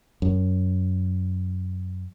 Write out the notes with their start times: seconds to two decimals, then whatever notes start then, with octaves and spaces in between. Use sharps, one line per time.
0.22 F#2